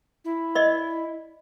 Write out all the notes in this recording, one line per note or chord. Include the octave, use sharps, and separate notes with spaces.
E4
D5 D#5